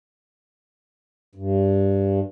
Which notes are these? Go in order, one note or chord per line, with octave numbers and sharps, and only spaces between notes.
G2